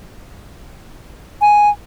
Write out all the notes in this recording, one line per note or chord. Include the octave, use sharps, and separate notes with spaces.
G#5